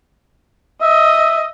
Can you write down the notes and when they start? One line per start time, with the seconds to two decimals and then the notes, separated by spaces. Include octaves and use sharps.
0.81 D#5 E5